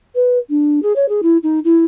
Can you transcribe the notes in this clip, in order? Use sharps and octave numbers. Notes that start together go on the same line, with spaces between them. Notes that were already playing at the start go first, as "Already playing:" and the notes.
B4
D4
G#4
C#5
G#4
E4
D#4
E4